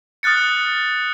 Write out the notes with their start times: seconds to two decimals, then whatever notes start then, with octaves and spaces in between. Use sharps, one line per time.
0.23 D#6 F6 F#6 A6 C#7